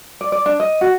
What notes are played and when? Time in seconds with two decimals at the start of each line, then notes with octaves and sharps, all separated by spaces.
0.21 D5
0.32 D5
0.46 D4
0.60 D#5
0.81 F#4